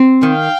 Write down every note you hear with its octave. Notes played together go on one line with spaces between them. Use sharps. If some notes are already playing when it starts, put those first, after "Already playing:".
Already playing: C4
D#3 F5 G5